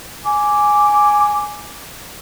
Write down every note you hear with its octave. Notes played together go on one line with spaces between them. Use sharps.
G#5 D6